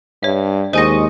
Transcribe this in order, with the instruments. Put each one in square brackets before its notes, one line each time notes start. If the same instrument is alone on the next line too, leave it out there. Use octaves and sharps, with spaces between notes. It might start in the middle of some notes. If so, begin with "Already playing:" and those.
[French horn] G2 [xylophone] C#5 E5
[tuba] D#2 [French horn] G#3 [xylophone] C5 G#5 A#6 [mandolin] D#5 C#6